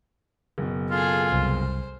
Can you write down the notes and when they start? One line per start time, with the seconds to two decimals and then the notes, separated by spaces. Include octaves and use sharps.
0.58 F#1 B2
0.91 F4 G#4 A4
1.33 C2 C5